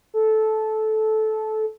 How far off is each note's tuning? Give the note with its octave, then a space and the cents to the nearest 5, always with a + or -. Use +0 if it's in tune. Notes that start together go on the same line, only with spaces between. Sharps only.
A4 -15